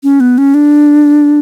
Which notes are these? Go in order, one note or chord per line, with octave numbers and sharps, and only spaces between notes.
C#4
B3
C#4
D4